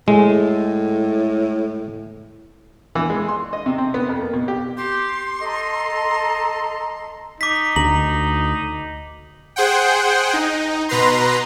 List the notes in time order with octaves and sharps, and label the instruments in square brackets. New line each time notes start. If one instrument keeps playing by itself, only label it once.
[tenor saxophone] A2 [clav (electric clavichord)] G#3
[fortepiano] E3
G#3
C6
D#5
C3
C4
B3
F2
A#3
B2
G4
[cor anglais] G4 [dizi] C6
[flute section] A4 A5 A#5 [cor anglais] D#5
[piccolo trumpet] D#4 [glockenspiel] D6 B6
[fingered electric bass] D2 [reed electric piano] A#5 [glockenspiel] F#7
[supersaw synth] G#4 C5 F#5 G5
D#4
B2 B4 A#5 C6